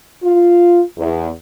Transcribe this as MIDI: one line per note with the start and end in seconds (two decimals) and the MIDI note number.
0.23 0.81 65
0.97 1.29 40